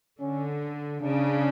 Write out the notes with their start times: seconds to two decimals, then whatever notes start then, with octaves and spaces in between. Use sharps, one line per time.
0.20 D3 C#4
1.02 C#3 D4